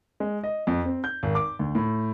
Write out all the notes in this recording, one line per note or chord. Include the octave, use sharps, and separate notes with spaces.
G#3
D#5
F2
C4
G6
G#1
D6
D2
A2